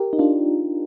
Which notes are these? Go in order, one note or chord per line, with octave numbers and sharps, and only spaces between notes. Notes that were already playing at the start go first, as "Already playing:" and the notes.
Already playing: G4 A#4
D#4
D4 F4